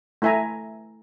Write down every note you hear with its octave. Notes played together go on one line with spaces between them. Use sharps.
A3 E4 E5 G#5 A#5